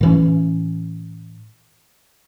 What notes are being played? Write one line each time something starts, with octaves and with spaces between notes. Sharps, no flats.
A2 E3 C#4